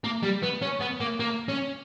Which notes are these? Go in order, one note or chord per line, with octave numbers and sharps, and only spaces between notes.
A#3
G3
B3
C#4
B3
A#3
A#3
C#4